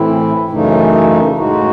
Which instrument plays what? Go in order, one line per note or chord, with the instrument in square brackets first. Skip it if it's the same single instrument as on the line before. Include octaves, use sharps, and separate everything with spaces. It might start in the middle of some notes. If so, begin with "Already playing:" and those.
Already playing: [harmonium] A2 E3 C4 E4
F#2 C#3 E3 A3 D#4
A2 G#3 D#4 F#4